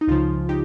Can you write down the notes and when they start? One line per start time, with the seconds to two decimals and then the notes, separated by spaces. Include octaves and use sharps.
0.01 D#4
0.07 C#2 C#3 F3 F4
0.49 D#4 G4